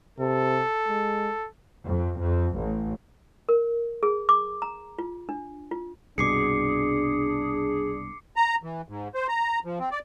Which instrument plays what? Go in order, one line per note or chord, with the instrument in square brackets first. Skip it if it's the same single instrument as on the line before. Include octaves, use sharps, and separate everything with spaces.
[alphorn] C3 [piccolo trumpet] A4
[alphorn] G#3
[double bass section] F2
F2
A1
[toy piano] A#4
G#4
D6
A#5
F4
D4
F4
[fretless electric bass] C2 G2 B2 [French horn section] D4 [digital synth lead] G#4 [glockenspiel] D6 C7 C#7
[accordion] A#5
E3
G#2
C5
A#5
F3
C4
D5